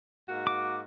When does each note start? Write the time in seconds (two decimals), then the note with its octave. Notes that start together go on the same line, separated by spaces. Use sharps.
0.29 G#2 A#3 F#4
0.47 D6